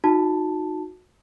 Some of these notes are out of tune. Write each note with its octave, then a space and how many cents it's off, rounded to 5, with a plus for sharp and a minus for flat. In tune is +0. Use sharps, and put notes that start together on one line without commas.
D#4 +0 F#4 -25 A5 +0